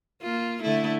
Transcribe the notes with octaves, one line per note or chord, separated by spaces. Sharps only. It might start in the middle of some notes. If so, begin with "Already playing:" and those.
A#3 F4
D3 A3 E4